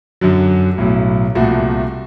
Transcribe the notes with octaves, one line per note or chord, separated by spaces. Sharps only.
F#2 D3 F#3
B1 A2 F#3
C2 A#2 F3 A3 F#4